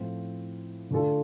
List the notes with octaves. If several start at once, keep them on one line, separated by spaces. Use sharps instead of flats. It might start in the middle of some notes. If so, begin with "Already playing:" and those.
Already playing: A2 F3 C4
D3 A3 D4 F4 A4